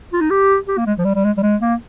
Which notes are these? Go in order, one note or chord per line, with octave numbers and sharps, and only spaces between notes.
F4
D#4
G4
G4
A#3
G#3
F3
G3
G3
G#3
G3
G#3
A#3